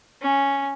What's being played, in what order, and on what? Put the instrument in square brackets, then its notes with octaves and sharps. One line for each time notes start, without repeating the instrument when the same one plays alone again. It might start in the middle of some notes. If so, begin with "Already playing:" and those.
[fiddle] C#4